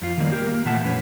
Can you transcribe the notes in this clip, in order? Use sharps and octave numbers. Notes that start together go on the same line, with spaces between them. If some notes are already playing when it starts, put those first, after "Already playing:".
F2 F4
D#3 F#3 G3 A#3 D5
G4 A#4
A#3
A#2 E3 A3 E5 F#5 A5
F2 A2 C#4 B4 C#5